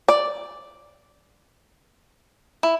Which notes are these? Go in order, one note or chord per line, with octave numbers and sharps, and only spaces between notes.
D5
E4